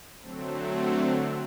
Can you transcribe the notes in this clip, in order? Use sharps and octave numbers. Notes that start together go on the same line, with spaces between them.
D3 F#3 A3 C4